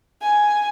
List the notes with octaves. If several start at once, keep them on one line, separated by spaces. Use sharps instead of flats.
G#5